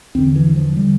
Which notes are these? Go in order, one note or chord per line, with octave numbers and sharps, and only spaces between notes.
E2 D3 C4
E3
F3
D3 G3